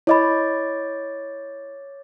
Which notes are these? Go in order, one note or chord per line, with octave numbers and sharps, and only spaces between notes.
E4 C#5 D#5 B5 D6 A6